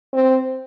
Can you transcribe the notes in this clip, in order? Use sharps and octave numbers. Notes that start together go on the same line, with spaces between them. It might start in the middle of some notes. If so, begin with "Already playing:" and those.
C4